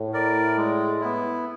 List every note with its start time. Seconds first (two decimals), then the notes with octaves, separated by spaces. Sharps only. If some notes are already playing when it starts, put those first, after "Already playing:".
Already playing: A2
0.13 A#4 D5
0.57 G#3
1.01 B3 E4